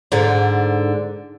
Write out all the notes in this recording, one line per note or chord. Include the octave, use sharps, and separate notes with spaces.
G#2 D3